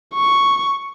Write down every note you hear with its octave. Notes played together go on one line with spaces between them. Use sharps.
C#6